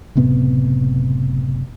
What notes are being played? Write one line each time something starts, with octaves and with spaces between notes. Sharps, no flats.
F#1 A2 C3 B3